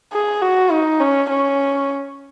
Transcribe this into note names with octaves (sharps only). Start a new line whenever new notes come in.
G#4
F#4
D#4
C#4
C#4